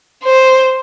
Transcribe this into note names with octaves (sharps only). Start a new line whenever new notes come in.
C5